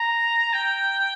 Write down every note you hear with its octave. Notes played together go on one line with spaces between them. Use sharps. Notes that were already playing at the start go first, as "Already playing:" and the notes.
Already playing: A#5
G5